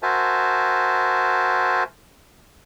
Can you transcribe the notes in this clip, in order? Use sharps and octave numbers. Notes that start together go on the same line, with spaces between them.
F#4 A#4 C5 E5 G#5 A5